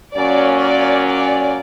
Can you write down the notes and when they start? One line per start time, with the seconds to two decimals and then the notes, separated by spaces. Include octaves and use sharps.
0.14 A#2 F#3 A#3 C#4 D5
0.60 D5
1.07 D5